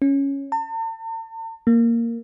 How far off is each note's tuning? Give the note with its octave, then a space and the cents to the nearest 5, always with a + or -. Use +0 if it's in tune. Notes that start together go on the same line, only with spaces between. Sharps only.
C#4 +0
A5 +45
A#3 -5